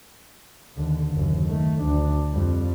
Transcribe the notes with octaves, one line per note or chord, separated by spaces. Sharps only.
D#2 D3
F#1 D#2
D#3 A3
D2 D4
F2 G3